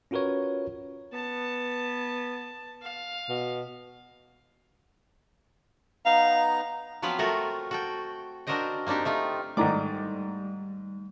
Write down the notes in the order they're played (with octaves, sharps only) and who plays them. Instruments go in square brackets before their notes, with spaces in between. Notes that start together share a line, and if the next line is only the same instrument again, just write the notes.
[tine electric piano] C#4 F4 F#4 A#4 B4 C#5
[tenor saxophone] B3 [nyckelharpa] A5
[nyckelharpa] F5
[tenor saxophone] B2
[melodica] B3 D#4 A#5 [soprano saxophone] F5
[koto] F3 F#3 B3 C4 B4 F5
A3 F4 F#4 A4 A#4
F#4 A4 G5
D4 F#4 A#4 C5 D#5 G5
A#3 C4 D4 D#4 G4
A3 D#4 F4
[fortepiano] G#2 D#3 D6 [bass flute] G3 [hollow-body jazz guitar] A3 D5 A#5